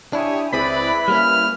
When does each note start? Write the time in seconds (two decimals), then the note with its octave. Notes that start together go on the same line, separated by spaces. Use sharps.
0.13 D4 E4 G4 C#5 G#5 D#6
0.53 C#2 C4 E4 G#4 B4 D5 B5
1.08 G3 A#3 C#4 F6